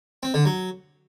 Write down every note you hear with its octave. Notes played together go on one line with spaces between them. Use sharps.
C4
D3
F#3